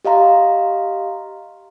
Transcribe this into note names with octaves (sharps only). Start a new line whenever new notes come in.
G4 D#5 F5 A#5 C6